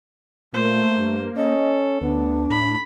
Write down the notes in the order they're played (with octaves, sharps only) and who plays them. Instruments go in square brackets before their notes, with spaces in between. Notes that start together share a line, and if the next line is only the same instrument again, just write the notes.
[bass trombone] A#2 [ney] A3 [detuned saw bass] A#3 [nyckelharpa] C5
[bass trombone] G2
[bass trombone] C#4 [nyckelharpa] A4 [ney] D#5
[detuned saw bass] D2 [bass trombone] B3 [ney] D4
[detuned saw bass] A2 [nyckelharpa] B5